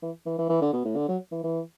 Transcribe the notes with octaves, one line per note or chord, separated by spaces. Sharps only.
E3
E3
E3
E3
D3
B2
A2
D3
F#3
E3
E3